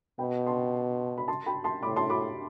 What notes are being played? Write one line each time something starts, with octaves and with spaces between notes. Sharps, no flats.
B2 G5 B5
A5 C6
B5
A5 C6
G5 B5
A5 C6
A2 B5 D6
A5 C6
B5 D6